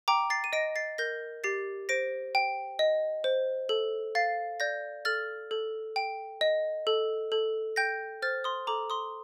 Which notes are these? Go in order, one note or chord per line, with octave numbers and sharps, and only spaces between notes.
G5 A#5 D6
A6 C7
D#7
D#5 A#6 D7
A6 C7
A#4 G6 A#6
G4 A6 C7
C5 A#6 D7
G5
D#5
C5
A4
F5 A6 C7
D5 G6 A#6
A4 F6 A6
A4
G5
D#5
A4
A4
G5 G6 A#6
C5 F6 A6
C6 D#6
A4 A#5 D6
C6 D#6